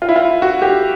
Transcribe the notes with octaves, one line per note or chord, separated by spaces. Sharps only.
F4
E4
F4
F#4
G4